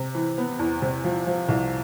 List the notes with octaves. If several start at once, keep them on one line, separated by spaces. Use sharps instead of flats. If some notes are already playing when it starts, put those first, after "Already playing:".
Already playing: C3
E3
B3
E2
C3
F3
F3
C2